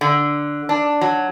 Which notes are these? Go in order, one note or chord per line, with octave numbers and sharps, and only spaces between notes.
D3
D4
F#3